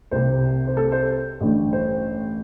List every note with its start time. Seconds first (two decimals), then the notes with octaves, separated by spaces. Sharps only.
0.11 C2 C3 C5
0.67 C5
0.77 A4
0.92 C5
1.40 A1 G2 D3
1.73 C5